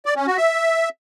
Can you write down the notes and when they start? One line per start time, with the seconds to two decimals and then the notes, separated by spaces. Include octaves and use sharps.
0.06 D5
0.16 C#4
0.27 F#4
0.37 E5